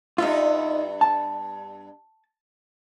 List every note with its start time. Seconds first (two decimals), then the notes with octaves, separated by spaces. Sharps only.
0.18 G2 B3 D#4 F4 E5
1.01 A5